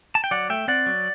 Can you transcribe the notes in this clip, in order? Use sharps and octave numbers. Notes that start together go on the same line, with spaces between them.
A5
G5
F#3 D5 F#5
A3 E5 G5
C4 D5 F#5
F#3